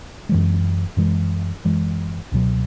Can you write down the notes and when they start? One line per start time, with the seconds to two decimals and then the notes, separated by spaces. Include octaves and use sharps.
0.29 F#2 E3 G#3
0.97 F#2 E3 G#3
1.64 F#2 E3 G#3
2.32 C#2 B2 F#3